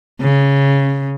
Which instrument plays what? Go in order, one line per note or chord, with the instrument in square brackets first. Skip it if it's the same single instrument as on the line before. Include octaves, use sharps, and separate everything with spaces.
[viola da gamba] C#3